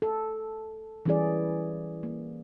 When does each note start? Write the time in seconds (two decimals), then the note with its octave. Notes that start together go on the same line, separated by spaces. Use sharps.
0.02 A4
1.06 E3 G3 C#4 E4 G#4 D5
2.03 A#3